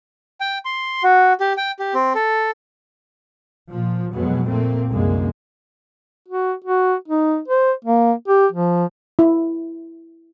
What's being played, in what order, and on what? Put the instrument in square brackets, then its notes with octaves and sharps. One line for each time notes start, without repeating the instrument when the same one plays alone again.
[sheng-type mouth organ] G5
C6
F#4
G4
G5
G4
C4
A4
[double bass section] A#2 F3
F2 B2 F#3 G#3 B3
A#2 A3 A#3 C4
C2 F#2 D3 G#3 A#3
[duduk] F#4
F#4
D#4
C5
A#3
G4
F3
[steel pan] E4